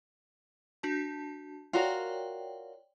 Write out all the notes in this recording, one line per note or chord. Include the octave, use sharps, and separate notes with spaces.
D4 F#4 A5
F4 F#4 A#4 C#5 D5 G5